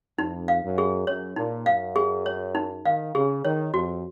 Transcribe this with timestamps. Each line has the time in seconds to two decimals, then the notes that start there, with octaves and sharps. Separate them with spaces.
0.18 F2 D#4
0.48 F5
0.63 F#2
0.78 G#4
1.07 F#2 C#5
1.36 A#2 D#4
1.66 F#2 F5
1.96 G#4
2.26 C#5
2.55 D#4
2.85 D#3 F5
3.15 C#3 G#4
3.44 D#3 C#5
3.74 F2 F#4